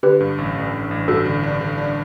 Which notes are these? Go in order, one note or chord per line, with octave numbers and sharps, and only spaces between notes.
D3 G4 B4
G2
A1
A1
A1
A1
G2 F#4 A4
D3
D4
D3
D4